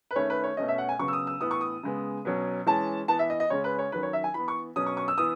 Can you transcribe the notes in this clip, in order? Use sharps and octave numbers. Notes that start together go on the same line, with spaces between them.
B4
D#3 A3 C#4 C#5
B4
C#5
B2 A3 C#4 D#5
E5
F#5
G#5
C#3 F#3 B3 C#6
E6
D#6
E6
A2 E3 B3 D#6
C#6
D#6
C#3 G#3 B3
B2 F#3 C#4
E3 G#3 C#4 A5
E3 B3 A5
E5
D#5
D#5
C#3 G#3 C#4 C#5
B4
C#5
D#3 F#3 C#4 B4
C#5
E5
G#5
E3 B3 B5
C#6
B2 F#3 C#4 D#6
C#6
C#6
E6
E3 B3 D#6